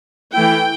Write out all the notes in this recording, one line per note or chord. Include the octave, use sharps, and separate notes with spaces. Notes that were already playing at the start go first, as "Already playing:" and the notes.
E3 A3 E4 G5